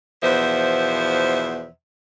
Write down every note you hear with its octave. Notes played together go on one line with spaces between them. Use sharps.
E2 B2 F3 C5 E5